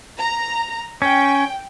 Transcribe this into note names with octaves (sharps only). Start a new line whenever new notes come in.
A#5
C#4 G5